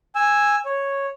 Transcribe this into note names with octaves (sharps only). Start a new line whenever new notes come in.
G#5 E6
C#5